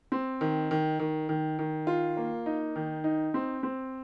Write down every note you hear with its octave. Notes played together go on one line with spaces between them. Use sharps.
C4
D#3
D#3
D#3
D#3
D#3
F4
A#3
D#4
D#3
D#4
C4
C4